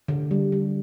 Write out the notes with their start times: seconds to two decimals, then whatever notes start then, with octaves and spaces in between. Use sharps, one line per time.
0.08 D3
0.31 G3
0.52 G3